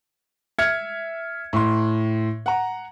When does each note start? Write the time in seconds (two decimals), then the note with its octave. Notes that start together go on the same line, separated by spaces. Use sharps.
0.59 E5 F6 G#6 C#7
1.53 A2 C6
2.46 F#5 A#5